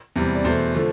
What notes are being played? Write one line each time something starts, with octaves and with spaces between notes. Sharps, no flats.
E2 C3 G3
D5
E2 B2 A3 C5
D3 F3 A3